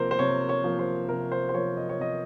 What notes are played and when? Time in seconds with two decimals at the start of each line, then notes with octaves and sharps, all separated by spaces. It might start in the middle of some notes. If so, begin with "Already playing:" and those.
Already playing: C3 F3 A#3 A#4 C5
0.11 C5
0.19 C3 C#5
0.49 C#5
0.64 F3 A#3
0.79 C5
1.09 C3 A#4
1.32 C5
1.49 C5
1.54 F3 A#3 C#5
1.77 D#5
1.89 C#5
1.99 C3 D#5